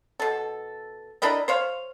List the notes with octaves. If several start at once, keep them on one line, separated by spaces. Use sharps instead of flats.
B2 A4
D4 E4 A#4 D#5
C5 C#5 F5